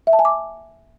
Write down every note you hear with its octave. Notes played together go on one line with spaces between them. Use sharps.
E5
A5
G#5
D6